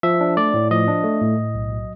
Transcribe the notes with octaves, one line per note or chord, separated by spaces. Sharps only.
F3 E5
D4
A3 D5
A2
F3 D#5
D4
A3
A2
A2
B1
F#3